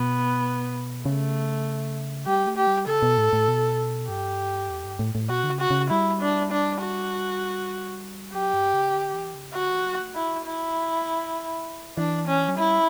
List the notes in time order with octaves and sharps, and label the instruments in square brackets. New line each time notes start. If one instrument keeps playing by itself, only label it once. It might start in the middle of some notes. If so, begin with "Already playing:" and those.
Already playing: [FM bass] B2 [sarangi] B3
[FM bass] C#3 [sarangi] A3
[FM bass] G3 [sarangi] G4
[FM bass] A3
[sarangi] G4
[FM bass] G3
[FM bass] C#3 [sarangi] A4
[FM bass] B2
A2
A2
B2
[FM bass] G2 [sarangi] G4
[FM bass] E2
G2
A2
A2
[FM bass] B2 [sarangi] F#4
[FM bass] D3
C#3
[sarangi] F#4
[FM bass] C#3
[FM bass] G3 [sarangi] E4
[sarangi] D4
D4
F#4
[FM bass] F#3 [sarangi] G4
[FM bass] G2
C#3
D3
E3
C#3
[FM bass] D3 [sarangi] F#4
[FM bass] E3
F#3
A3
[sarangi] E4
E4
[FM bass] E3 [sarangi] D4
[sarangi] C#4
[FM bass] F#3
[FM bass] G3 [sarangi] E4